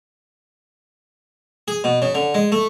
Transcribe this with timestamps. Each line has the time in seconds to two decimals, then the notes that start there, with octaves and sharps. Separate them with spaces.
1.68 G#4
1.84 B2
2.02 C#3
2.15 D3
2.34 G#3
2.52 A3